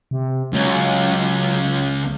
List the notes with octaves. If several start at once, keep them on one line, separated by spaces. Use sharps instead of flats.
C3
C#2 F#3